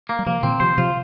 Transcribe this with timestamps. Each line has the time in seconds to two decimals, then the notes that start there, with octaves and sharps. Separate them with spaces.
0.09 A#3
0.19 G3
0.26 C3 F3 A#3
0.43 A#2 D#3 C4
0.60 C3 F3 C5
0.78 C3 F3 F4